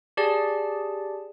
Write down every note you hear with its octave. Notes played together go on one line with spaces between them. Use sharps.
G4 G#4 D5 A5